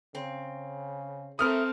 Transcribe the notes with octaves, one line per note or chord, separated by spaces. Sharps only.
C#3 C4
A3 C4 A4 A#4 D#6 F6